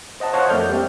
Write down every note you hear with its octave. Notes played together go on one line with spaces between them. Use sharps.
C5 D#5 F#5 A5
C5 C#5 D#5 F5 F#5 C#6
F2 A3 A#3 D5 F6 G6
G3 C4